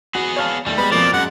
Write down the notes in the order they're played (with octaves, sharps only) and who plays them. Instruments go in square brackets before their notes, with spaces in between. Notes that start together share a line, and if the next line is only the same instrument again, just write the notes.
[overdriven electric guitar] B3 G#4 [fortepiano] F#4
[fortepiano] C#5 F5 A5
[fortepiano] D#2 A3 [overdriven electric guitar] G3
[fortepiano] G#3 B3 [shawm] B5
[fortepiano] F2 B2 A#3 [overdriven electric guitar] F3 [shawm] D5
[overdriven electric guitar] F#2 [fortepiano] G#3 [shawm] F#5